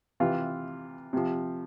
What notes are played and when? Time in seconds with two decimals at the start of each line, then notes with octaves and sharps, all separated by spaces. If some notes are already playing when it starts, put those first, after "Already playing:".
0.20 C3 E3 F4
1.13 C3 F3